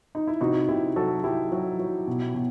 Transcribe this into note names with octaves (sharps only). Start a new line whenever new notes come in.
D#4
E4
C3 D#4 F#4
C3 E4 G4
F#3 F#4 A4
F#3 E4 G4
F#3
F#3
B2
B2